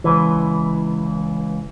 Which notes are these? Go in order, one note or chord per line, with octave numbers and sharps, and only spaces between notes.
C#2 E3